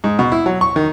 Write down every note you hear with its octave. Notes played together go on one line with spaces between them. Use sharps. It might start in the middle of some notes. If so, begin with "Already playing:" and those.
G#2
B2
E4
F#3
C#6
D#3